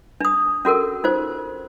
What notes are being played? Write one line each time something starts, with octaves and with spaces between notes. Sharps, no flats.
D4 D#6
C#4 F#4 A4 A#4
D#4 F4 C5